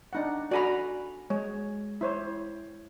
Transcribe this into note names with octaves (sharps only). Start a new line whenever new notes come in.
D4 D#4 F#5
F#4 A4 D5 G#5 A#5 B5
G#3 C#5
E4 C5 C#5